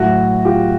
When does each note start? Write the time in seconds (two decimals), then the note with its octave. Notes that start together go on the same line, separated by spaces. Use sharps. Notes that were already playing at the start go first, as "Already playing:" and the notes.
Already playing: A2 F#3 A3 E4 F#4
0.45 F4 G4